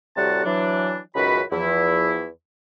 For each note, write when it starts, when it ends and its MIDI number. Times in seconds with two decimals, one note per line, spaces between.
0.16 0.43 45
0.16 0.43 48
0.16 0.43 55
0.16 0.43 66
0.16 0.43 78
0.16 0.43 81
0.44 0.97 52
0.44 0.97 54
0.44 0.97 62
1.15 1.41 37
1.15 1.41 42
1.15 1.41 51
1.15 1.41 66
1.15 1.41 71
1.15 1.41 83
1.51 2.25 40
1.51 2.25 53
1.51 2.25 64